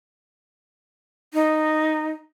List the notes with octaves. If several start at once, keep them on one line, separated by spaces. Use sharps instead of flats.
D#4